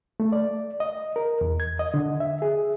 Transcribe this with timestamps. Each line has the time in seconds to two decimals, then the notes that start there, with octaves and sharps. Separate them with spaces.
0.20 A3
0.32 D5
0.80 D#5
1.16 A#4
1.41 E2
1.60 G#6
1.79 D#5
1.94 D3
2.20 E5
2.42 G#4